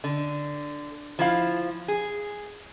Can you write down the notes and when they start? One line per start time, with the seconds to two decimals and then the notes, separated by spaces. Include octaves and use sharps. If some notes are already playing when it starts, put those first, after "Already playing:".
0.04 D3
1.19 F3 E4 F5
1.88 G#4